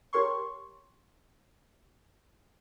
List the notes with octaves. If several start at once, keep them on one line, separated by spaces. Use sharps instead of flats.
G4 A#4 C#5 C6 C#6